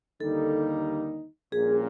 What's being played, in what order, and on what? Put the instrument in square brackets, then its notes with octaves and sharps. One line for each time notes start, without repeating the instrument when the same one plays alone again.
[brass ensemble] D#2 D3 G3 A#3 D#4 [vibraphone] A4
[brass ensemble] A#1 A#2 G3 A#3 C#4 [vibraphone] G#4